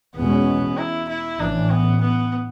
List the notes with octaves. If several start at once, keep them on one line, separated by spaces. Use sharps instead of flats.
E2 B2 G#3 B3 C#4
E4
E4
A1 A2 E3 D4
B3
B3